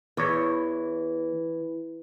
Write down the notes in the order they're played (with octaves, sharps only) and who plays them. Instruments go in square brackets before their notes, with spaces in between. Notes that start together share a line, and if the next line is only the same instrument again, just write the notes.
[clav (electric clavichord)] E2 C#5 [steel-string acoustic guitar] E3